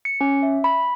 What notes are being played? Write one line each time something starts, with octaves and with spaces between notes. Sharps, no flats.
C#7
C#4
E5
B5